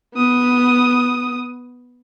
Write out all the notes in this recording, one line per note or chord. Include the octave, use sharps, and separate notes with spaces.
B3 D#6